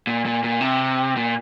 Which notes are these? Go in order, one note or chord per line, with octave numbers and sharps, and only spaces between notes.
A#2
A#2
A#2
C3
A#2